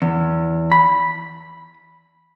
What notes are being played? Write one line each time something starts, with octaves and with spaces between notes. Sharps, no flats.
E2
B5